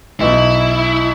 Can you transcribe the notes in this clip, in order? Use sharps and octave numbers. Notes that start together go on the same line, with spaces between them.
B1 E4